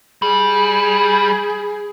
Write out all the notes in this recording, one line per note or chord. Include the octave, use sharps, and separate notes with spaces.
G3 G#4